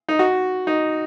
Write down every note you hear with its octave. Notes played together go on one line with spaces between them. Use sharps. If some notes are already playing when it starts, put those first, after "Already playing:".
D#4
F#4
D#4